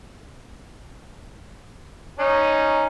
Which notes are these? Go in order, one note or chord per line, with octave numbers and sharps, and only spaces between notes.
C#4 D#4